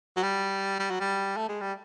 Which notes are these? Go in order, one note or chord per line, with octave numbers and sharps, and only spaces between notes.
F#3
G3
G3
F#3
G3
A3
G#3
G3